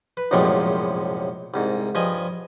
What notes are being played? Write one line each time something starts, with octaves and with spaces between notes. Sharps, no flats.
B4
A#1 F#2 A2 C3 F3 G#3
C2 G#2
G2 F3 D#5 G#5